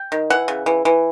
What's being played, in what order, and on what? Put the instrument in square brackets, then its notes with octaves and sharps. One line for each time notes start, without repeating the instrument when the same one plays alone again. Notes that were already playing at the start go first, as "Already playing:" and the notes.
Already playing: [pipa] G5
D#3
E3 F#5
C#3
E3
E3